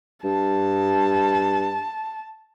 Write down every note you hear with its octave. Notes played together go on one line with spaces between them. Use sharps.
G2 A5